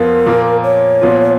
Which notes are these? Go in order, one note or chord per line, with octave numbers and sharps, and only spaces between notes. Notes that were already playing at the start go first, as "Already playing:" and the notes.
Already playing: F2 F3 B3 F4 A#4
A#2 F3 A#3
C#5
A#2 F3 B3 F4